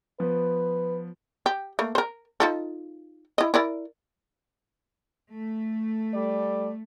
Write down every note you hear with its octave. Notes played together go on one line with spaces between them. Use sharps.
F3 B3 B4
G4
A3 A#3
A#4 C5
D#4 F4 A4
E4 D#5
E4 A#4 D5
A3
G3 A4 D5